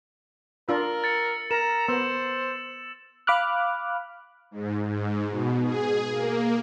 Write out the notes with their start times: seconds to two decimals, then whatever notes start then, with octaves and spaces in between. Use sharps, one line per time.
0.69 D4 F4 A#4 E6
1.04 A6 C#7
1.51 A#4 A#5 E7
1.89 B3 C5 E6
3.27 F5 B5 D6 F6 F#6
4.51 G#2
4.86 G#2
5.29 B2
5.64 G#4
6.11 A#3